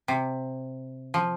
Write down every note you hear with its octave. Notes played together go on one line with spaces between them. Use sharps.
C3
F3